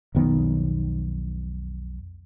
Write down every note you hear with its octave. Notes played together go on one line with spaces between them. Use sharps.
B1 F2 D#3 B3